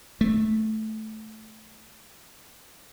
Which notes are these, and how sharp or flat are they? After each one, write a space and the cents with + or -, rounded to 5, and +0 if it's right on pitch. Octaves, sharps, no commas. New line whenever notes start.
A3 -10